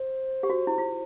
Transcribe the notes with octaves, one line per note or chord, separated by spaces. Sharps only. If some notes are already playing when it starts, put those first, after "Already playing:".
Already playing: C5
G4
F#4
E4
F4